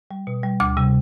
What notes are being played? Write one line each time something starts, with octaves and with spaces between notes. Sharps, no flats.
G3
B2
G3
D2 D6
C3 G3